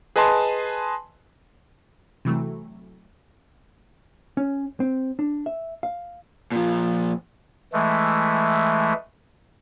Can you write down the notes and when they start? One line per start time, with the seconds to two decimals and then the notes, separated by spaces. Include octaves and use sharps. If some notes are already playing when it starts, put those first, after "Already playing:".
0.16 G#4 B4 D#5 G#5 A5 C6
2.25 C3 E3 F#3 A3
4.37 C#4
4.80 C4
5.19 D4
5.46 E5
5.83 F5
6.52 A#2 F3
7.73 E3 G#3 A3